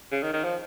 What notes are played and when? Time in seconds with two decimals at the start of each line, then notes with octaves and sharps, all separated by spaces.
0.12 C#3
0.23 D#3
0.33 D#3
0.44 F3